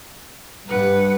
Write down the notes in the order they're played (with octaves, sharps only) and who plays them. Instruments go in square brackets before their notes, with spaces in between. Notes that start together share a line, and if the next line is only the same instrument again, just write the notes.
[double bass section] G2 [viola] B4 F#5